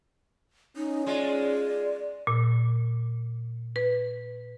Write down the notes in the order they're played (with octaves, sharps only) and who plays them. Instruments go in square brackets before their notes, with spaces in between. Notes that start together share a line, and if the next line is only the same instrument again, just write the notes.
[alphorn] C#4 [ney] D#4
[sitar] G#3 F4 [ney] D5
[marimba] A#2
B4